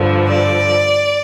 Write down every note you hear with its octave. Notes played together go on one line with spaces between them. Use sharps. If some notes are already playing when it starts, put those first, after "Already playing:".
Already playing: G2 D3 F3
D5